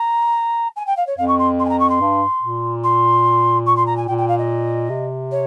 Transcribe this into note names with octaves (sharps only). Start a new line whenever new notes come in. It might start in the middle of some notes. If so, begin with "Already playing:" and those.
Already playing: A#5
G#5
G5
F5
C#5
F2 F5
C#6
C6
C6
G#5
A#5
C#6
C6
G2
A#2
C6
C#6
C6
A#5
G#5
A#2 G5
G5
F5
D#5
C3
C#5